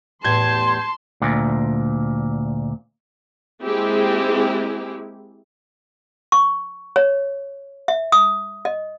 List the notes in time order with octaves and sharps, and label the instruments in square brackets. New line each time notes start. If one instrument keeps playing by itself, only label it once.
[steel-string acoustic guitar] E2 A2 G4 [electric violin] A5 [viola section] C6 [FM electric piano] G6 G#6
[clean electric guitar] D2 A#2
[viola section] G#3 A#3 C4 E4 G4 G#4
[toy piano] C#6
C#5
E5
D#6
D#5